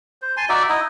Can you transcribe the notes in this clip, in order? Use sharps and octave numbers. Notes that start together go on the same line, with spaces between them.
C5
G#5 A5 C6
D#4 F#4 D5 E5
D#4 E4 D#5